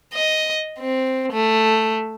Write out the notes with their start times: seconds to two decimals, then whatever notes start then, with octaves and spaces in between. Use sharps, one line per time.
0.14 D#5
0.79 C4
1.33 A3